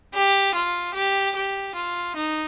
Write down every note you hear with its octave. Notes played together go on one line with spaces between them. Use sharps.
G4
F4
G4
G4
F4
D#4